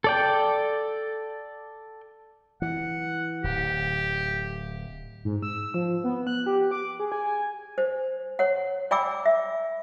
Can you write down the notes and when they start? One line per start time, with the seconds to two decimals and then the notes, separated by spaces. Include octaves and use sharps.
0.04 A4 D5 G5
2.62 E3 F#5
3.44 D1 G4
5.25 G#2
5.43 E6
5.74 F3
6.04 B3
6.27 F#6
6.46 G4
6.71 D6
7.00 G#4
7.12 G#5
7.26 G#5
7.78 C5
8.39 C#5 F#5
8.91 D5 G5 G#5 B5 D6 E6
9.26 E5